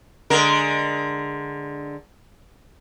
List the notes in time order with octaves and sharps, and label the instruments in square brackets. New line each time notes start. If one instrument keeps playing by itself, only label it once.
[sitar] D3 G#3 A#4